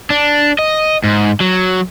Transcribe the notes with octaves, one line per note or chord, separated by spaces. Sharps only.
D4
D#5
G#2
F#3